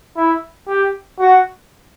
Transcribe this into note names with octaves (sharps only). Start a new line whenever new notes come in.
E4
G4
F#4